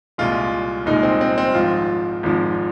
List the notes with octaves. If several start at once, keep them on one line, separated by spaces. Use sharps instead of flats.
C2 A#2 G#3 F4
C2 A#2 G#3 D#4
C4
C4
C4
G#1 G#2 F3 F4
G#1 G#2 F3